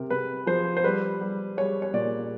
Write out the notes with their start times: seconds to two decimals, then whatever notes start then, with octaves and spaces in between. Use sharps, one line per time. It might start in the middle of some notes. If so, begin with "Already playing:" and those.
Already playing: C3 A#4
0.10 C3 B4
0.47 F3 C5
0.77 C5
0.84 G3 B4
1.21 G3
1.57 G3 C#5
1.82 C#5
1.94 A#2 D5